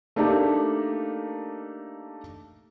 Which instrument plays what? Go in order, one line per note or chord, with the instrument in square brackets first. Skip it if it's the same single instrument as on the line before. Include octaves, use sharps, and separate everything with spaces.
[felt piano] A3 A#3 D4 D#4 G4